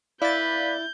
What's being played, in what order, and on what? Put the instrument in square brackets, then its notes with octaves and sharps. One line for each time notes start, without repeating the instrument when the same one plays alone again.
[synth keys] E4 A6 [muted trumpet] B4 [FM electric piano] D5 F5 [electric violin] G6